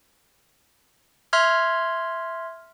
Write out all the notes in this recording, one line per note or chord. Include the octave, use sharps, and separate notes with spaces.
E5 C6 F6 G#6